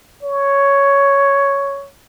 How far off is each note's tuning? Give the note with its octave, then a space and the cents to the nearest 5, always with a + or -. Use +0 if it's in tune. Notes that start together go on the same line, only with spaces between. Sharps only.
C#5 +5